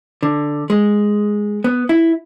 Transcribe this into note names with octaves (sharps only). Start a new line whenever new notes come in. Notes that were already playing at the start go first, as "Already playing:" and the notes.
D3
G#3
B3
E4